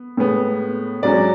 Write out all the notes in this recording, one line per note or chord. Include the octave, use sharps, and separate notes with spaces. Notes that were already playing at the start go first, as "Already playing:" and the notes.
Already playing: B3
A2 G#3 B3
G#2 F#3 C#4 D5